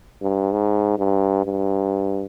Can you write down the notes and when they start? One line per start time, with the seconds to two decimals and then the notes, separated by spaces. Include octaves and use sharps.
0.22 G2
0.52 G#2
0.98 G2
1.45 G2